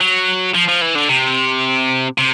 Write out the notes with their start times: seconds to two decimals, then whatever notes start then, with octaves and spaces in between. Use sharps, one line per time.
0.01 F#3
0.54 F3
0.68 F3
0.81 E3
0.95 D3
1.09 C3
2.18 C3